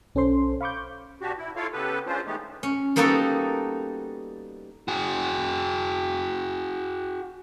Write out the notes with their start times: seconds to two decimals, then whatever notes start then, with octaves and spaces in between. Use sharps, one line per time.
0.15 B1 C#4 A4 C5 C6
0.61 F5 B5 C#6 D6 G6
1.20 B2 D4 F#4 G4
1.38 E4
1.56 E4 F4 A4 C#5 F5
1.73 C#3 B3 G4 A4 B4
2.06 G#3 C#4 D4 F4 C5
2.26 E3 G#3 A3 B3 D#4 G4
2.63 C#4
2.96 G3 A#3 B3 D#4 F#4 A4
4.88 F#4 G#4